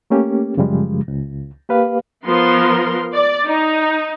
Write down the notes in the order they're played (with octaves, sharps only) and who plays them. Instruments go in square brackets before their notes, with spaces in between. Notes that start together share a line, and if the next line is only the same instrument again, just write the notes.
[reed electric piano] A3 A#3 C#4 G4
F#2 C#3 F3 G3 G#3
C#2
A#3 G4 B4 F5
[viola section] F3 B3 A#4 C6
D5
D#4